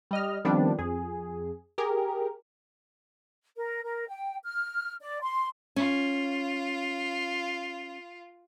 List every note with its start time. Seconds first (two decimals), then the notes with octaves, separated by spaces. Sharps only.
0.11 G3 D#5 F6
0.45 D#3 F3 G3 B3 C4 D4
0.79 F2 G#4
1.78 G4 G#4 A#4
3.57 A#4
3.84 A#4
4.08 G5
4.45 F6
5.00 D5
5.21 C6
5.76 C#4 F4